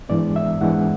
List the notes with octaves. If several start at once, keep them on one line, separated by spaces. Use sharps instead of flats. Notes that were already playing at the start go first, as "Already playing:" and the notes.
G#2 E3 G#3 B3 D4 D5
E5
G#2 E3 G#3 B3 D4 F#5